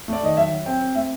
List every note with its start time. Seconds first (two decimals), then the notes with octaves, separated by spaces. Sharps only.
0.08 A3 D5
0.23 D#3 D#5
0.37 F#3 E5
0.52 F#3
0.66 C4 G5
0.81 C4
0.95 A3 E5